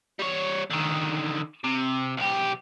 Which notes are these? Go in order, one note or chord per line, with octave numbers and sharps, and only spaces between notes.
G3 C#5
D3 D#3
C3
B1 G4